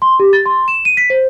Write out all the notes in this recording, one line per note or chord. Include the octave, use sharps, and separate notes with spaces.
C6
G4
A6
C6
E7
D#7
B6
C5